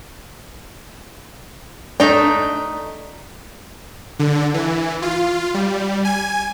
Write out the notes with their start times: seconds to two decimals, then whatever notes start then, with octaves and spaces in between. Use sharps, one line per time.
2.00 A3 D4 D#4 G5
4.19 D3
4.54 E3
5.02 F4
5.54 G3
6.05 G#5